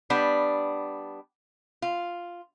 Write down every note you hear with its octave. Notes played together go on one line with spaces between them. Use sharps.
G3 B3 D4
F4